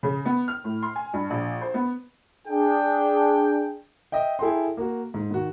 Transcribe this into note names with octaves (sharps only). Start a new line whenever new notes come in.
C#3
B3
F6
A2
C6
G#5
G2
A#1
C5
B3
D4 G#4 G5
D#5 E5 G5
E4 G#4 A4 G5 C6
A#3 F#4
G#2
D#3 F#4